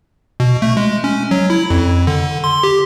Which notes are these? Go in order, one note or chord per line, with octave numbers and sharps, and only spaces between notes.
B2
A3
G#3
C#4
F#3
E4
F2
D3
C6
G4